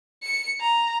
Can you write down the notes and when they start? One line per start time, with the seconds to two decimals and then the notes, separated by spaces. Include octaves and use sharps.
0.23 C#7
0.61 A#5